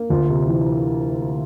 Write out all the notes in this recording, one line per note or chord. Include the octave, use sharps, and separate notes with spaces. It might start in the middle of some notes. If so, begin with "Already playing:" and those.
Already playing: A#3
D2 F4
C3
E3